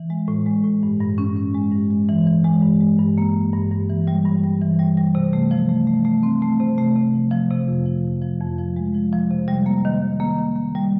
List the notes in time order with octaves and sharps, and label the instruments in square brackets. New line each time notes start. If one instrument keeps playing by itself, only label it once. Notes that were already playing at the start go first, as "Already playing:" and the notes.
Already playing: [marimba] E3
G#3
A2
G#3
A2
G2
G2
C#4
C#4
G#3
G2
G#3
E3
E3
G#3
G2
G#3
G2
A#3
G2
G2
G2
E3
G3
G2
G3
E3
G3
G3
C3
A3
F3
A3
A3
A3
C4
A3
C3
A3
C3
F3
F3
C3
F2
F3
F2
F3
F2
F3
G#3
F3
F3
C3
G3
A#3
D#3
D#3
A#3
D#3
A#3
G3